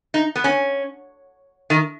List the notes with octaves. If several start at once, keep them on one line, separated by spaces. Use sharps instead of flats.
D#4
B3
C#4
D#3